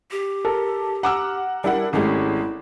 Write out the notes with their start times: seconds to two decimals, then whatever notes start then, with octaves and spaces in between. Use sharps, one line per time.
0.11 G4
0.45 A4 A#4
1.03 F#5 A#5 D6 E6 F6
1.64 G3 D4 E4 A#4 F#5
1.93 G#1 G#3 A3 C#4 E4 G4